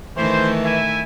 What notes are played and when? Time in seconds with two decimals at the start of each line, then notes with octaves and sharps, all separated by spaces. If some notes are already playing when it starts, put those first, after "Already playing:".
0.17 D#3 E3 A3 C5
0.64 E4 E5 G#5